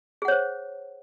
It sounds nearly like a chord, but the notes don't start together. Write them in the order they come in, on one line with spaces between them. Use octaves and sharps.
G#4 F#5 C#5 C5